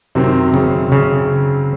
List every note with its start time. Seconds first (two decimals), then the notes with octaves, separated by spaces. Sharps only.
0.15 F#2 C3 D#3 F#3 C4
0.54 C#3
0.92 C#3